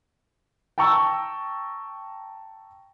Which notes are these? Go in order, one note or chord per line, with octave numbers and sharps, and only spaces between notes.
G5 A5 A#5 C#6 E6